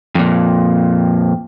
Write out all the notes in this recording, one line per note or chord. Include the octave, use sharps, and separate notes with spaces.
F2 A#2